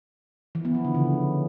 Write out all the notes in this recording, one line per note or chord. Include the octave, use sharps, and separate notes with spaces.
E3
B3
F3
D3
C#3